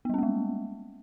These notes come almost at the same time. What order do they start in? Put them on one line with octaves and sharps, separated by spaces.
B3 G3 C#4 A#3 G#3